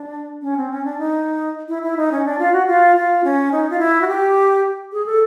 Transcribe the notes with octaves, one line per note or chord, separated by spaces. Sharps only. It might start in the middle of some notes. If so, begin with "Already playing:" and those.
Already playing: D4
C#4
C4
C#4
D4
D#4
E4
E4
D#4
C#4
D4
F4
F#4
F4
F4
C#4
D#4
F4
E4
F#4
G4
G#4
A4